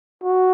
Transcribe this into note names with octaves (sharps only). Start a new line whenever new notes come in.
F#4